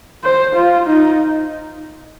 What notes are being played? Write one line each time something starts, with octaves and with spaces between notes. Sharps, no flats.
C5
F4
D#4